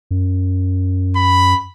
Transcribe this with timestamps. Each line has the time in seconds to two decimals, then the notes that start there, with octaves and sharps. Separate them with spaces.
0.11 F#2
1.17 B5